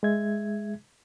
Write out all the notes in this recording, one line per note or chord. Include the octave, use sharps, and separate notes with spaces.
G#3 G#4 E5 G#6